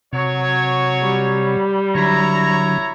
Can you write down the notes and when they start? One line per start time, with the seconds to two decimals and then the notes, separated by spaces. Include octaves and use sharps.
0.13 C3 F#3 C#5
1.02 G3
1.95 D3 F#3 E4 C#5 A#5